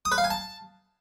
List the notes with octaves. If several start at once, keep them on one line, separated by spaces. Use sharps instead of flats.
D#6
B4
F5
G#5
A5